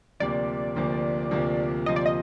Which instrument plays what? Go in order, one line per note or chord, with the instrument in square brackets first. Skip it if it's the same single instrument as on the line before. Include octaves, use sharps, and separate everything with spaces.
[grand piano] D2 C3 F3 A#3 [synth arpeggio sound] D5
[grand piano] D2 C3 F3 A#3
D2 C3 F3 A#3
[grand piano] D2 C3 F3 A#3 [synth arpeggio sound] D#5
[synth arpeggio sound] D5
D#5